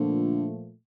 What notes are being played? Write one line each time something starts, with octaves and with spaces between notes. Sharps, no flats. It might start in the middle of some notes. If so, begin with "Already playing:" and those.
Already playing: A#2 D3 F3 A3